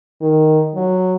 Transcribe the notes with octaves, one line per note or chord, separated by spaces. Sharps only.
D#3
F#3